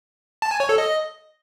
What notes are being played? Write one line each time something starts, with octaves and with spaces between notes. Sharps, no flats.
A5
G#5
C#5
A4
D#5